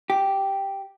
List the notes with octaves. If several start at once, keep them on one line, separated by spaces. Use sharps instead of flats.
G4